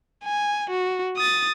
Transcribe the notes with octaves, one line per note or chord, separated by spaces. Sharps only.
G#5
F#4
D#6 A6